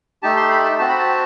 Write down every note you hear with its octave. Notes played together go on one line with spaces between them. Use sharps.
A3 D#4 G4 A5
C6
B5
A5
C4 F#4 A5
B5
A5